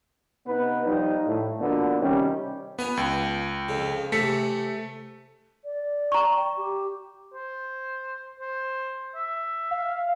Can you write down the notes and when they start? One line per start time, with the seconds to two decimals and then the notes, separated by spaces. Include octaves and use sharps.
0.46 C3 B3 D#4 B4
0.85 F3 G3 D#4
1.26 A2
1.60 B2 D3 F3 A#3 B3
2.00 C3 D#3 G3 C#4
2.79 B3 F4 G#5 C#6
2.97 C#2
3.69 F2 C#3
4.12 C3 E3 A3 B6 C#7
5.64 D5
6.12 A#5 C#6
6.34 G5
6.57 G4
7.34 C5
8.40 C5
9.16 E5
9.71 F5